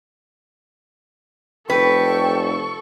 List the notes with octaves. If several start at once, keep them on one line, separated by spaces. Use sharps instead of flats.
F1 A4 B4 G5 C#6